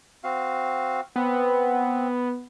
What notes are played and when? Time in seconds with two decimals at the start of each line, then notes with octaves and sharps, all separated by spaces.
0.24 C4 F#4 F5
1.16 B3 C4